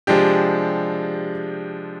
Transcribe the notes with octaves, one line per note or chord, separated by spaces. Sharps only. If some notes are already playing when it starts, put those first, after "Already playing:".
C3 F3 G#3 D4 G4